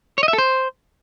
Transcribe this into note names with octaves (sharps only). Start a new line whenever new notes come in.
C#5
D#5
E5
A4
C5